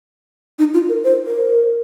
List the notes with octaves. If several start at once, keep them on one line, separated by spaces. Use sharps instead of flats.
D#4
F4
A#4
C5
A#4